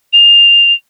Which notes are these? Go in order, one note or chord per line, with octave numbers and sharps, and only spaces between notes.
F7